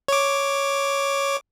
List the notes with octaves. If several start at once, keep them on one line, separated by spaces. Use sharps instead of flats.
C#5 D6